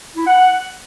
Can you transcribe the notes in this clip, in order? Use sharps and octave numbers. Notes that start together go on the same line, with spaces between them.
E4
F#5
F#5